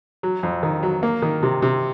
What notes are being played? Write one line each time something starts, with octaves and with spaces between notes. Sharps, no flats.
F#3
F2
D#3
F#3
A#3
D#3
C3
C3